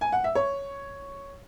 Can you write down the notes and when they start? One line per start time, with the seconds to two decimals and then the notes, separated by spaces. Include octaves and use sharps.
0.01 G#5
0.12 F#5
0.24 E5
0.35 C#5